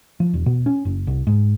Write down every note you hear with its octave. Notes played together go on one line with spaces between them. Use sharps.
F3
E1
B2
C#4
F#1
C2
G#2